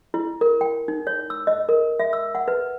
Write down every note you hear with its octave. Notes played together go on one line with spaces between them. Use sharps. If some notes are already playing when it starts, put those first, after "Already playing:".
E4
A#4
G5
D#4
C#5
E6
D#5
A#4
E5
E6
F#5
B4